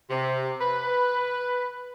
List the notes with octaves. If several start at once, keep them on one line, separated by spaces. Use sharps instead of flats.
C3
B4